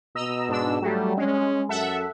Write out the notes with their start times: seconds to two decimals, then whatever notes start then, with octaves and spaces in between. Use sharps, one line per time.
0.15 B2 D#5 A#5 E6
0.49 G#2 D4 E6
0.82 F#3 G3 A3
1.17 G#3 C#4
1.69 F#2 A4 E5 F#5